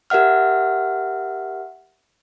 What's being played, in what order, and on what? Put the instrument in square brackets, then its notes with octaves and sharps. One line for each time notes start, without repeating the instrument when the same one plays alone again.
[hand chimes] G4 A#4 E5 F#5 F6